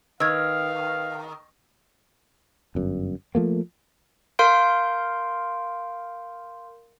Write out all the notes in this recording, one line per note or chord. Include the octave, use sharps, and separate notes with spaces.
D#3 B4 F5 E6 F6 G#6
G1 F#2
F3 A3 A#3
A#4 F5 C6 G6 D7